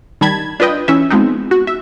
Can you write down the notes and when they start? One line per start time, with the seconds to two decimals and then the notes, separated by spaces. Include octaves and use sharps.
0.21 D#3 G3 A5 B5 G#6
0.60 D4 F4 B4 D#5 G5
0.88 E3 C#4 E5
1.10 F3 G#3 B3 C4 D#4
1.51 F#4
1.67 E5